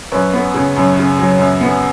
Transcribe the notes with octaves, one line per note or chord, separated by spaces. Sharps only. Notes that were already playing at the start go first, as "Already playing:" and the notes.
F#2 B4 C#5
B3
C#3
F#2
C#3
F#3
F#2
B3